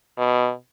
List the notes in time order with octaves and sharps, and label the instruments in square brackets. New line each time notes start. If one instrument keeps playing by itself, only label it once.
[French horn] B2